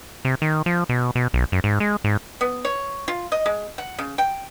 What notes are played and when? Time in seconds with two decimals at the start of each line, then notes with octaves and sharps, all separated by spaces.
0.25 C3
0.42 D#3
0.66 F3
0.89 B2
1.15 B2
1.34 B1
1.52 F#2
1.64 G#2
1.80 G#3
2.04 G#2
2.41 B3
2.65 C#5
3.08 F4
3.32 D#5
3.46 G#3
3.78 F#5
3.99 C#3
4.18 G5